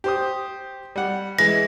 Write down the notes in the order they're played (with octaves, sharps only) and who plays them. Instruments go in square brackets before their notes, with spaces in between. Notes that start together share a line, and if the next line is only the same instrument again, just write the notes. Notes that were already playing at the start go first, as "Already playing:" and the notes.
[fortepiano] G4 C5 D#6
G3 F#5
[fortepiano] E3 G#3 [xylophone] A#6